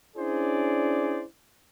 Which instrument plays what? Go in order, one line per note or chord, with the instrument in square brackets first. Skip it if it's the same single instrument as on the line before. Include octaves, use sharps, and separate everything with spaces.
[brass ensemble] C#4 D4 E4 G#4 C5 D5